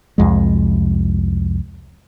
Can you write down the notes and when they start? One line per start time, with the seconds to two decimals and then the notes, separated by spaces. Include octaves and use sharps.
0.18 C2 F2 G#3